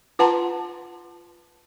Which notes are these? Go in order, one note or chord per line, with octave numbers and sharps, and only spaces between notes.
F4 B4 F#5 A5 A#5 C6